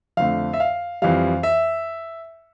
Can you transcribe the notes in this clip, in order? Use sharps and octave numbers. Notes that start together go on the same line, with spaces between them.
F2 D3 A3 F5
E5
F5
F2 E3 G3 F5
E5